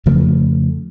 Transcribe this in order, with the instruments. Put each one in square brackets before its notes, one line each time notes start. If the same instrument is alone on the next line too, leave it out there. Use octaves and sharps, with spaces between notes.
[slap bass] F2 C#3 F3 A3